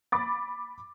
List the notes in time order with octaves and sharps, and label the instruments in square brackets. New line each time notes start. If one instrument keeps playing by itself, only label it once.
[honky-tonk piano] B5 D6 A6